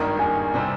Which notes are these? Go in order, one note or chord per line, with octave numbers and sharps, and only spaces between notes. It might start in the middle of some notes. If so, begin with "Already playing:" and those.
Already playing: G#1 G2 D#3 A#3 D#4
G#5
C3 G3 C4